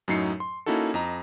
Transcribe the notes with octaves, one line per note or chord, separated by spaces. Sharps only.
F#2 A2 F#3 D#4 C7 C#7
C6
A#3 C#4 D#4 E4 F#4 A4
F2 D#5 A#5